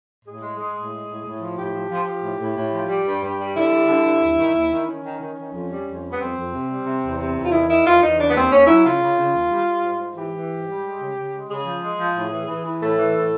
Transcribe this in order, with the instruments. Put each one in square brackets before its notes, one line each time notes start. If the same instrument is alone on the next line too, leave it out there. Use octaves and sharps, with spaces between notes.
[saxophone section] A2 G#4
G#3
G#3
A2
G#3
A2
A2
F3
A2 G4
F3
F3
F3
A2
A2
A2
F3
G3
G2
G2
G3
D3 E4
G3
D3
G2
D#2
D#3
D#2
D#3
D#3 C#4
D#3
D#3
D#3
F2
G3
F2
G3
B3
F2 C4
F2
C3
G3
C3
E2
C3
E2
F4
D#3 E4
D#3 E4
E2 F4
E2 D#4
C#3 D4
B3
D#2 C4
D#2 C#4
F#3 E4
C#3 F4
C#3
C#3
D#2
G3
G3
G#2
G#2
E3 G4
E3
G#2
G3
G#3
C#3
C#3
G#3
C#3 G#4
F3
G#3
F3
A2
E3
E3
E3
A2 A4
E3
A2